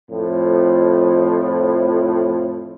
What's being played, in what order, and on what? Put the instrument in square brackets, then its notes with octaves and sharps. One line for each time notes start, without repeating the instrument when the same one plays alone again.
[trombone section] F2 A2 F3